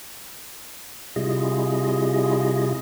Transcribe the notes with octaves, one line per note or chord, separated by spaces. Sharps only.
C3 G3 E4 F4 G#4 D#5